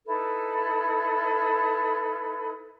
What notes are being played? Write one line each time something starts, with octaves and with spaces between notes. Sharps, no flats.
D#4 E4 A4 B4